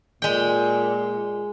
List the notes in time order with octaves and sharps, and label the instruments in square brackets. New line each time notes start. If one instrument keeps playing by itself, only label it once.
[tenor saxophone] A#2 [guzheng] G#3 G5